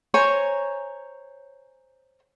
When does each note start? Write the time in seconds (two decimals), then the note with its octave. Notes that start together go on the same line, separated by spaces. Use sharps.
0.14 C5 C#5 G#5 A#5